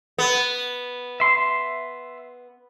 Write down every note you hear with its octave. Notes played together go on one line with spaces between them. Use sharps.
B3
E5 C6